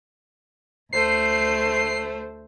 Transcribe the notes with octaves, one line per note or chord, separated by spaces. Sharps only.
D2 A3 C5 C7